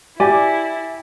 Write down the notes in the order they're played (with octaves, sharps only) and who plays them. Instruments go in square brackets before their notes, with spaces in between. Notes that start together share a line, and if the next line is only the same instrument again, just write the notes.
[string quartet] E4 [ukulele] G4 G#5 [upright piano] D5